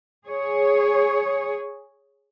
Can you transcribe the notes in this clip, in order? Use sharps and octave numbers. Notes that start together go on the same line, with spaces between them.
G#4 C#5